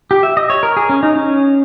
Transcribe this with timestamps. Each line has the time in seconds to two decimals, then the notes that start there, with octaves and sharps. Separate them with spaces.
0.11 G4
0.23 E5
0.37 D#5
0.50 C#5
0.63 A#4
0.77 G#4
0.89 C#4
1.03 D#4
1.16 C#4